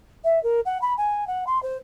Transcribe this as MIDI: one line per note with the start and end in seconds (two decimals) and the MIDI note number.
0.24 0.41 76
0.43 0.60 70
0.65 0.80 78
0.81 0.94 83
0.98 1.27 80
1.27 1.44 78
1.47 1.61 84
1.63 1.77 72